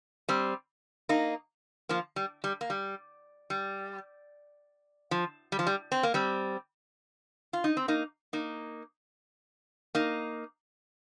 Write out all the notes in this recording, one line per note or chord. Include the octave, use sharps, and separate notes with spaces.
G3 C4
A#3 D#4
F3 A#3
G3
G3
A#3
G3
G3
F3
G3
F3
G3
C4
A#3
G3 C4
F4
D#4
C4
A#3 D#4
A#3 D#4
A#3 D#4